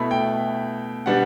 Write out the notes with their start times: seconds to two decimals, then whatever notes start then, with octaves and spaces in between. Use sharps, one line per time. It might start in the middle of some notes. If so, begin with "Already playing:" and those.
Already playing: B2 A3 E4 B5
0.11 G5
1.06 B2 G3 B3 D4 F#5